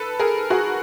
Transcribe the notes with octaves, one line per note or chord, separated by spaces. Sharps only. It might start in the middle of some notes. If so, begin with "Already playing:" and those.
Already playing: A4 B4
G#4 A#4
F#4 G#4